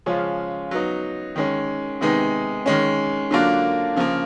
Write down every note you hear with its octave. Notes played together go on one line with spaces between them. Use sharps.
C#3 F3 G#3 C#4 F4
F#3 B3 D#4
D#3 G#3 C#4
C3 D#3 G#3 B3 D#4
D#3 G#3 C#4
D3 F#3 A#3 D4 F4
C#3 F3 A#3